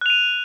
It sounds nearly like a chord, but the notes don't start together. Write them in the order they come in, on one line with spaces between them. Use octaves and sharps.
F#6 F7 D#7